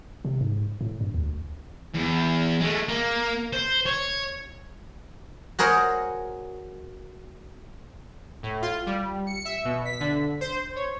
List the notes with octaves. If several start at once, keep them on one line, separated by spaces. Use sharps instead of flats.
C3
G#2
A2
G2
D2
E2
G#3 A3
A#3
C5
C#5
F#4 G#4 A#4 C5 C#5
A2
F4
G3
C#7
E5
B2
B6
D3
C5
C#5